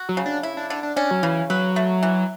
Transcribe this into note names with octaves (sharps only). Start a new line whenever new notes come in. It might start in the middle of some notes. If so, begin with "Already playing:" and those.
Already playing: F#4
F#3
C#3
D4
E4
D4
D3 D4
D4
C#4 D4
F#3
C#3 E3
F#3 B4
A3
E3